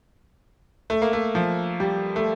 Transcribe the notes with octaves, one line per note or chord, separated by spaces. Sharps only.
A3
A#3
A3
F3
G3
A3